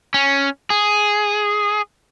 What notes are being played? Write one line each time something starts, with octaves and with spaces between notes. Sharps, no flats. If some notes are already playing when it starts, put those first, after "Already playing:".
C#4
G#4